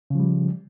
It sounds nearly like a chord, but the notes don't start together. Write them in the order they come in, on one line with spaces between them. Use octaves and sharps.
C#3 F3 G3